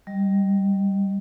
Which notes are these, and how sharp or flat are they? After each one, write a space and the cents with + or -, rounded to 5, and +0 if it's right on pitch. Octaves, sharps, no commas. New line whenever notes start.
G3 +0 D#5 +0